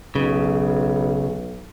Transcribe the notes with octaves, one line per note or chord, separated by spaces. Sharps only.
B1 C#3